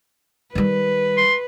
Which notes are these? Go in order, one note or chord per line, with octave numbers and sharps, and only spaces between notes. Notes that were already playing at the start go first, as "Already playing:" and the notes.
D#3 G3 B4
C6